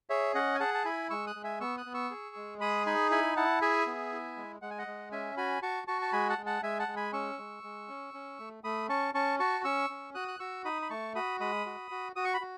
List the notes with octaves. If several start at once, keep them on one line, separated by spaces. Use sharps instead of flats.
G#4 C#5 E5
C#4 D#5 F#5
G#5
G#4 F#5 A5
A5
E4 G#5 B5
G#3 C#6 E6
D#6 F#6
G#3
E5 G#5
B3 C#6 E6
D#6 F#6
B3
C#6 E6
G#4
G#3
G#4 B5 D#6
D#4 G#5 B5
E4 G#5 B5
E4 F#5 A5
G#4 E5 G#5
B3
E4
G#3
G#3 F#5
G#5
D#5 F#5
G#3
C#4 E5 G#5
F#4 G#5 B5
F#4 A5 C#6
F#4 A5 C#6
A5
G#3 G#5 B5
F#5 A5
G#3
F#5 A5
G#3 E5 G#5
F#5 A5
G#3
G#5 B5
C#4 C#6 E6
G#3
G#3
C#4
C#4
A3
A3 B5 D#6
C#4 A5 C#6
C#4 A5 C#6
F#4 A5 C#6
C#4 C#6 E6
C#4
F#4 D#6 F#6
F#6
F#4 C#6 E6
D#4 B5 D#6
B5
A3 A5 C#6
F#4 B5 D#6
G#3 B5 D#6
F#4
F#4
F#4 D#6
C#6
B5
F#4